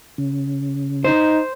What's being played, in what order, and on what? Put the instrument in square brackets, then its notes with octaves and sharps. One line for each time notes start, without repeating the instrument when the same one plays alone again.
[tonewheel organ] C#3
[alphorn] D#4 [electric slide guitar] C5